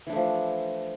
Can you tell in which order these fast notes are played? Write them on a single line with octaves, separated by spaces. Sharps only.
E3 D4 A3 F3